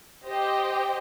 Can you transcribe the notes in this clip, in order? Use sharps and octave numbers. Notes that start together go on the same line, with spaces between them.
G4 C5 D#5 G5